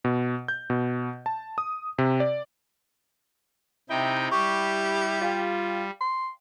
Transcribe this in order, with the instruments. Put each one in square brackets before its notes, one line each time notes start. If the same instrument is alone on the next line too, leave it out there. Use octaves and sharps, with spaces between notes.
[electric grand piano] B2
G6
B2
A5
D#6
C3
D5
[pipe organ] C3 D#4 G5 [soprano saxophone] E4
[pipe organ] G3 [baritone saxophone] G4 [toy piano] C#6 D6
[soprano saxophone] F4 [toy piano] D5 F5 G5
[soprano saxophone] C6